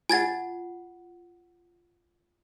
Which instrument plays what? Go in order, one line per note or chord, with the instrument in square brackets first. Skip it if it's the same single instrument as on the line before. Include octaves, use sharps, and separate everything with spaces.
[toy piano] F4 F#5 [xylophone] G#5 G#6 A6